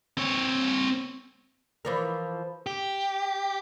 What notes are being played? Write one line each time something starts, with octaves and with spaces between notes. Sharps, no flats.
C4 C#5
E3 F3 A#4
G4